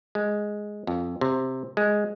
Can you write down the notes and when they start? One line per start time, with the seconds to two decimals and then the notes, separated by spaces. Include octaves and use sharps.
0.15 G#3
0.87 F2
1.21 C3
1.77 G#3